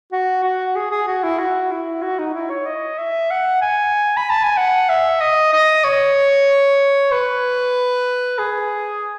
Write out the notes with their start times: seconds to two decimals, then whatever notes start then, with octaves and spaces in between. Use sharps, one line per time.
0.12 F#4
0.44 F#4
0.76 G#4
0.91 G#4
1.07 F#4
1.24 E4
1.39 F#4
1.71 E4
2.03 F#4
2.19 D#4
2.34 E4
2.50 C#5
2.66 D#5
2.98 E5
3.30 F#5
3.62 G#5
4.17 B5
4.30 A5
4.44 G#5
4.57 F#5
4.89 E5
5.21 D#5
5.53 D#5
5.84 C#5
7.12 B4
8.39 G#4